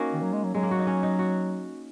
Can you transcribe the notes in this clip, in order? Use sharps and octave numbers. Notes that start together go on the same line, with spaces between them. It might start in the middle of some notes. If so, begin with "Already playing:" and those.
Already playing: A#3 C#4 D#4 F#4
D#3
F#3
G#3
F#3
F#3 G#3
A#3
F#4
D#4
C#4
D#4
F#4